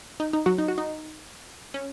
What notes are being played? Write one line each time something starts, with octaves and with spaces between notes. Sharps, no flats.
D#4
D#4
F#3 F#4
D#4
F#4
D#4
C#4